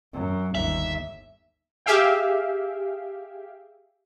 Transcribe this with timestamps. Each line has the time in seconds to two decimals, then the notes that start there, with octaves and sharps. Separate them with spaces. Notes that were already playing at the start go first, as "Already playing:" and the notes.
0.13 F#2
0.55 G1 D#2 E5
1.86 G4 G#4 E5 F5 G5